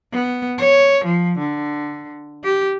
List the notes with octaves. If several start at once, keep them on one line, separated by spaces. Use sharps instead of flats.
B3
C#5
F3
D3
G4